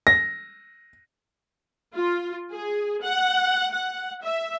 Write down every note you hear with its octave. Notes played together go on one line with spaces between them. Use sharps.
A#6
F4
G#4
F#5
F#5
E5